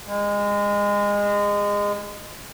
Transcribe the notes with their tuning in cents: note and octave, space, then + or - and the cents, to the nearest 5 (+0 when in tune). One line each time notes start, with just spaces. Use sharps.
G#3 -25